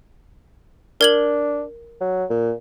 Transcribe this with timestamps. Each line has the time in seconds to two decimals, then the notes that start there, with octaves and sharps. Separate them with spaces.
1.01 D4 A#4 G#6 F#7
2.01 F#3
2.30 A#2